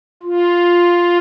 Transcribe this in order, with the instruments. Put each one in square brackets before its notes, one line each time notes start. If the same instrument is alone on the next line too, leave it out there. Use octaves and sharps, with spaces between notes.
[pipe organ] F4